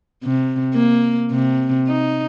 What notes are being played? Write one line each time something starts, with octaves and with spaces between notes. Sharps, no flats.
C3
A#3
C3
D#4